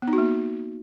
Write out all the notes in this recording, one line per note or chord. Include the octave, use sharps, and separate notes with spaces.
B3
D#4
F#4
A#3